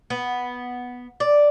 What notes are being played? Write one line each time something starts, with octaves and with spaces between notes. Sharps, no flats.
B3
D5